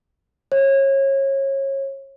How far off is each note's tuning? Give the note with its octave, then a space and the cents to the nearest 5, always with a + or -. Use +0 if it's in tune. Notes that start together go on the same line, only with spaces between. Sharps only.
C#5 -25